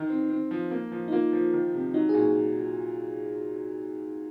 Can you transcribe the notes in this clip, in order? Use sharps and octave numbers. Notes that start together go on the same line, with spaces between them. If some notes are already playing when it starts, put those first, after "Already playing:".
Already playing: D#3 D#4
C4
C4
F3
A#3
F3
D#4
A#3 F4
F3
D#3
C3
F#3 D#4
G#4
A#2 F#4